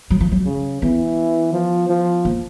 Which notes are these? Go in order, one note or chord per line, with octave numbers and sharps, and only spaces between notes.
F#3
F3
F#3
C#3
E3 B3
F3
F3
A#3